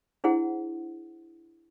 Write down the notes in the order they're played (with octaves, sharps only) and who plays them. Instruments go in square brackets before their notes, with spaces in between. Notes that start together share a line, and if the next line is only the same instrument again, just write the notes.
[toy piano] D4 E4 G#4 C5 F#5